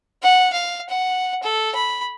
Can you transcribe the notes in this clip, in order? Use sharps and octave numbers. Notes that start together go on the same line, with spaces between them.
F#5
F5
F#5
A4
B5